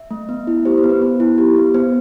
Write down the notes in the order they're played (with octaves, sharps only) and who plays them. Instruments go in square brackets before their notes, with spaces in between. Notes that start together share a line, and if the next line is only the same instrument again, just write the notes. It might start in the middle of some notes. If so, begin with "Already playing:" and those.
Already playing: [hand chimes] E5
A3
B3
E4
G4 C5
C5
B3
B4
B3
E4
G4
B3
B3 C5